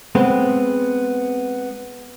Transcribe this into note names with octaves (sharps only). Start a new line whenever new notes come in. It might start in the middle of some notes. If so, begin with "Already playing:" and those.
G#3 B3 C4